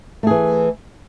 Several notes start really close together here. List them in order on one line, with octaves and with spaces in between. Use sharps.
A3 G#4 E3